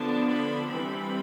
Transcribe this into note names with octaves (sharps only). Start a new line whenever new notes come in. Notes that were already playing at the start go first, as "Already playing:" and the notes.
Already playing: D3 F3 B3 D4 A5
B5
E3 G3 C4 B5